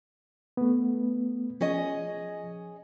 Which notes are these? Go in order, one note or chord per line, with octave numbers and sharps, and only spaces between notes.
A3 B3
F3 C#4 G#4 D#5